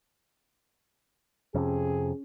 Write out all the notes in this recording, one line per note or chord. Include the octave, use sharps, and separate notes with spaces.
F2 C3 C#4 G#4